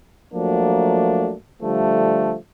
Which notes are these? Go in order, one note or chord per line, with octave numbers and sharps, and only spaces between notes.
F3 F#3 A3 A#3 D4
D3 F3 G3 A3